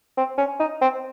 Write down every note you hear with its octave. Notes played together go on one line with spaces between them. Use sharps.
C4
C#4
D#4
C4